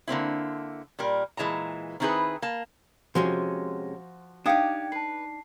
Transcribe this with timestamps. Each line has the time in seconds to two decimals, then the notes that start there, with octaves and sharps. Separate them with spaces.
0.08 D3 A#3 C4 E4
0.99 A#2 G3 A#4
1.37 A#2 E3 G#3 A5 A#5
2.00 D#3 C4 D#4 E4 G#4 B4
2.42 A#3 A5
3.15 C3 F3 G#3 C#4 F#4 C6
4.46 D4 D#4 G4 F5 G5 D#6 G#6 C#7
4.92 B4 A5 C7